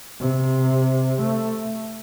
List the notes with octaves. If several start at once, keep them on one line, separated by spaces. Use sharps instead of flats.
C3
A3